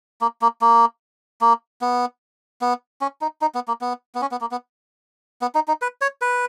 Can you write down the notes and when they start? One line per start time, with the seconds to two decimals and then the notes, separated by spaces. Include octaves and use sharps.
0.21 A#3
0.42 A#3
0.61 A#3
1.41 A#3
1.81 B3
2.61 B3
3.01 C#4
3.21 D#4
3.41 D#4
3.55 B3
3.68 A#3
3.81 B3
4.15 B3
4.21 C#4
4.31 B3
4.41 A#3
4.51 B3
5.42 B3
5.55 D#4
5.68 D#4
5.82 B4
6.01 C#5
6.21 B4